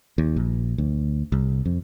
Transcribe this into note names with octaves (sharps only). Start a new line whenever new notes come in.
D#2
A#1
D2
C2
F2